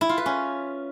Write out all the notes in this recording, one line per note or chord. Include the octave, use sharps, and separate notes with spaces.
E4
F4
B4
C#4